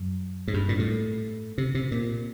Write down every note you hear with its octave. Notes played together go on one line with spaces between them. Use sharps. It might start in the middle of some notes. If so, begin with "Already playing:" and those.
Already playing: F#2
G#2
G2
A#2
A2
C3
C3
A#2